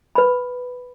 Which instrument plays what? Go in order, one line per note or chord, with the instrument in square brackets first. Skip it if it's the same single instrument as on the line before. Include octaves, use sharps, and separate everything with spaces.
[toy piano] B4 B5